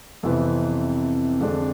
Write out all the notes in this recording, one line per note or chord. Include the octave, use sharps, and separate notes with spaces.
F2 C3 E3 B3
F2 D3 G#3 D4